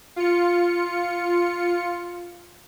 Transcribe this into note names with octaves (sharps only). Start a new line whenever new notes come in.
F4 C#7